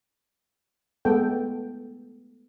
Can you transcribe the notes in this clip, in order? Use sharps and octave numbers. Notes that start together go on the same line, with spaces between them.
G#3 A3 B3 A4 G5